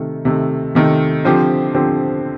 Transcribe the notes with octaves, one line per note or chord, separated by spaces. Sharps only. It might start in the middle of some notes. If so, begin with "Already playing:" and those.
Already playing: C3 D#3 A3
C3 D#3 A3
C3 D#3 A3
D3 F3 C4 G4
D3 F3 C4 G4